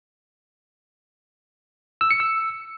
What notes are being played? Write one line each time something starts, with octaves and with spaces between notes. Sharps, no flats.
E6
C#7
E6